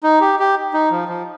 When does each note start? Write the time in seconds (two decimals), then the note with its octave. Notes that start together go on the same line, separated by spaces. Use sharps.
0.03 D#4
0.21 G4
0.39 G4
0.74 D#4
0.91 F3
1.08 F3